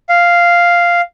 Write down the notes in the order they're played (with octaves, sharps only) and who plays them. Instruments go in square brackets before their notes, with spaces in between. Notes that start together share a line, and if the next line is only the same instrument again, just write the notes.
[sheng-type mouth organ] F5